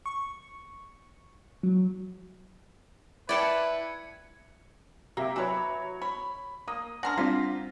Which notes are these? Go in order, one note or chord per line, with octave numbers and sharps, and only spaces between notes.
C#6
F#3
E4 B4 D5 G5 A5 G#6 C#7
C3 A#3 E5 D6
E3 F#3 B4 C#5
C#5 B5
A#3 D#6
C#4 D4 A#4 F#5 C6 F6 A#6
G3 C4 D4 F4 C5 B6